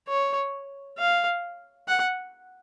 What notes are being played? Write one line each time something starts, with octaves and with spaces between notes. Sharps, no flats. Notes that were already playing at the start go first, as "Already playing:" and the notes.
C#5
F5
F#5